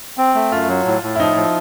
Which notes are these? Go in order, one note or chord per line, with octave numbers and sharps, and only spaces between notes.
C4
A3
F#2 F4
F#3
A2
A2
E4
F3 D#4
F3